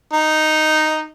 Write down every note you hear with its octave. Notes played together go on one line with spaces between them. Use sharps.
D#4